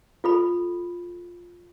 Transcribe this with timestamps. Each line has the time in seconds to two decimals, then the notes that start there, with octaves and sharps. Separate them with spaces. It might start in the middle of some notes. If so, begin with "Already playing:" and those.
0.24 F4 A4 B5